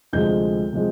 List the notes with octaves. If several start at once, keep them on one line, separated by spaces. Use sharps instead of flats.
D2 C3 F3 G#3 G6
C3 F3 G#3